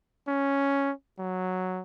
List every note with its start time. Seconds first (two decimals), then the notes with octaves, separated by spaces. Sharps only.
0.28 C#4
1.19 F#3